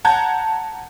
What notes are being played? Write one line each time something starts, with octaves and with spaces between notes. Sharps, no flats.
F#5 A5 A#5 G6 G#6